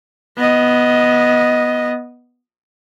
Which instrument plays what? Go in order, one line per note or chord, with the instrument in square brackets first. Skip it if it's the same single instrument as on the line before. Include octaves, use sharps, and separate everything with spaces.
[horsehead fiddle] B3 D#5